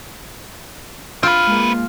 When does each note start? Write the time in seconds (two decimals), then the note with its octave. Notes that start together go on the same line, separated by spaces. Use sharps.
1.23 C4 F4 B4
1.47 G#3 A#3